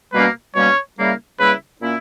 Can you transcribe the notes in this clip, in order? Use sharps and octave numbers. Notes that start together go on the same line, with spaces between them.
B2 G3 A#3 C#4 B4
B2 G3 A#3 C#4 C#5
C#3 G3 A#3 E4
C#3 G3 A#3 E4 B4
A#2 A#3 C#4 E4